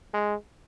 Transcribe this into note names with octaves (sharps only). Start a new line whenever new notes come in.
G#3